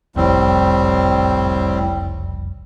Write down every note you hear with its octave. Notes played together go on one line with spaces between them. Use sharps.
F#1 C2 F2 A2 G3 C4